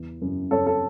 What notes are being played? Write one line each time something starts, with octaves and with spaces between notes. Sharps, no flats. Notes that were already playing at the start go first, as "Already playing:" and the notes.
Already playing: E2 E3
F#2
F#2 A4 C#5
A4